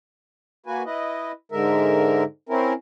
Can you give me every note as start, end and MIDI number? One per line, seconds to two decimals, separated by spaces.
0.66 0.83 58
0.66 0.83 66
0.66 0.83 71
0.66 0.83 80
0.85 1.32 64
0.85 1.32 71
0.85 1.32 75
1.52 2.24 44
1.52 2.24 50
1.52 2.24 56
1.52 2.24 70
1.52 2.24 76
2.49 2.73 60
2.49 2.73 61
2.49 2.73 64
2.49 2.73 70